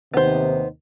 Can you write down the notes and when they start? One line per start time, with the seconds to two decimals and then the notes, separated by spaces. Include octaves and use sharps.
0.14 D#2 C3 D#3 B3 C5